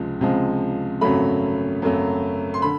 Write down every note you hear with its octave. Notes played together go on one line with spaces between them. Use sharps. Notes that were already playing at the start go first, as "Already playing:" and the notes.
Already playing: C#2 C3 F3 G#3
C#2 C3 F3 G#3
G#1 F#2 C#3 F#3 A3 B5
G#1 F#2 C#3 F#3 A3
C6
D3 B5